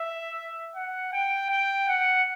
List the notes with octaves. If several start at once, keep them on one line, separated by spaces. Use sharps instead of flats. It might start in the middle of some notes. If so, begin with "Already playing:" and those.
Already playing: E5
F#5
G5
G5
F#5